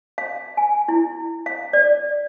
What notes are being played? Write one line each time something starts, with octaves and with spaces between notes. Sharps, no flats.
F5
G#5
E4
F5
D5